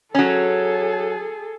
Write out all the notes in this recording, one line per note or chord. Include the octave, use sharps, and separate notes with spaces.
F#3 C#4 G#4 A4